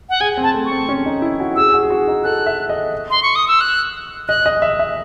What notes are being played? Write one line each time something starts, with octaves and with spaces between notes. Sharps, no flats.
F#5
G#4 G#5
C4
A5
A3
C#6
C4
C#4
D#4
E4
F#4
G#4 E6
G#4
F#4
G#4
F#4
D#4
A4 F#6
E5
D#5
C6
C#6
D#6
E6
F#6
D#5 F#6
D#5
E5
E5